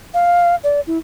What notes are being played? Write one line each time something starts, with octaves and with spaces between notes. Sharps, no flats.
F5
D5
E4